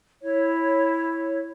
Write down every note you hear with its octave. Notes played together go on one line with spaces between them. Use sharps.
E4 C#5